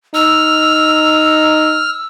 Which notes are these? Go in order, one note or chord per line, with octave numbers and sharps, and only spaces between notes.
D#4 E6 F6